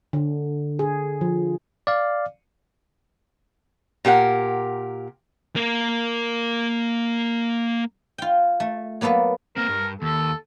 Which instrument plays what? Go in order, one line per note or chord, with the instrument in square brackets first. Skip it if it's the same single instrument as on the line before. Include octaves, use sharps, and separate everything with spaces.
[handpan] D3
G#4
F3
[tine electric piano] D5 F5
[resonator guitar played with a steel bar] A#2 G4 A#4 F#5
[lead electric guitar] A#3 A#4
[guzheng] F4 G5
A3
F#3 A#3 B3 A4 B4
[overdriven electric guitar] A#3 C4 [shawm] A#4
[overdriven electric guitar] G2
[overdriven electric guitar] D#2 [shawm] A4